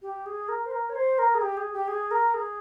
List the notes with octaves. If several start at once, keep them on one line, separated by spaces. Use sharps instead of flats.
G4
G#4
A#4
C5
A#4
C#5
C5
A#4
G#4
G4
G#4
G4
G#4
A#4
G#4